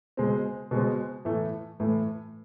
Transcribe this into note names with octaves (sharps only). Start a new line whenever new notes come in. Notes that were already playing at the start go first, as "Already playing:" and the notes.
B2 G#3 C4
B2 G#3 C4
A2 E3 A3
A2 E3 A3